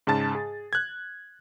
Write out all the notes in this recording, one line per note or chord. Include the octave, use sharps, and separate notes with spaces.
G#2 C#3 A5 A6
G#4
F#6 G#6